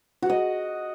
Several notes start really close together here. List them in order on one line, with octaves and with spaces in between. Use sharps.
F#4 F#5 D#5